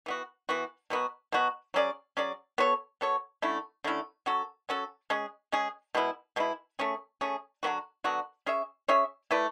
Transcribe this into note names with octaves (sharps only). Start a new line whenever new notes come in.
E3 B3 F#4
E3 B3 F#4
B2 F#3 B3 F#4
B2 F#3 B3 F#4
F#3 C#4 G#4 D5
F#3 C#4 G#4 D5
B3 F#4 A4 C#5
B3 F#4 A4 C#5
D3 A3 C#4 E4
D3 A3 C#4 E4
F#3 C#4 F#4 A4
F#3 C#4 F#4 A4
G#3 C#4 G#4
G#3 C#4 G#4
B2 G#3 B3 E4
B2 G#3 B3 E4
A3 C#4 G#4
A3 C#4 G#4
D3 F#3 B3 F#4
D3 F#3 B3 F#4
C#4 G#4 C#5 E5
C#4 G#4 C#5 E5
A3 E4 B4 D5